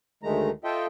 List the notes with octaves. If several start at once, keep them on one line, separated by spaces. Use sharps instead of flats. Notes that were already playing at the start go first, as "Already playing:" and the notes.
D2 D#3 G#3 A3 A#5
F4 A4 C5 D#5 E5 G5